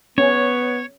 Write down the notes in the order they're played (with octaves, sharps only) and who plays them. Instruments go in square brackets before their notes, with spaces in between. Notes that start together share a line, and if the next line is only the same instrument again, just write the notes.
[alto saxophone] B3 [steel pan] C#4 [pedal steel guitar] C#5